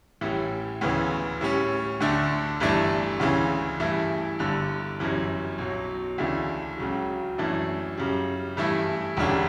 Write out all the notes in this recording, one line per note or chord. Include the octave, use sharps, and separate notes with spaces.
A1 A2 E3 G3
D2 C#3 E3 B3
A2 G3 C#4
D2 D3 A3 D4
G1 G2 E3 A3 D4
D2 C#3 E3
G2 E3 A3 E4
G1 G2 D3
G1 F#2 E3 G3
B1 B2 F#3
D2 C#3 E3 A3 D4
C#2 C#3 F#3
F#2 E3 A3 D4
F#2 C#3 G3
G2 E3 A3 E4
E1 D2 C#3 G3 D4